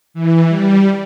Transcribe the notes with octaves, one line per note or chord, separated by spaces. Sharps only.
E3
G3